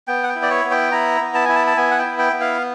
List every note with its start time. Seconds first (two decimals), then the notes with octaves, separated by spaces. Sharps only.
0.08 B3 G5
0.23 F#5
0.29 G5
0.36 E4
0.42 D5
0.50 C#5
0.65 B3
0.71 G5
0.92 E4 A#5
1.21 B3
1.35 A5
1.45 E4 G#5
1.56 A5
1.67 A5
1.77 B3 G#5
1.91 F#5
1.98 G5
2.05 E4
2.19 G5
2.33 B3
2.41 F5